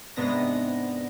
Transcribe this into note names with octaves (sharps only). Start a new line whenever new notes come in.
G#2 C3 B3 D4 A#6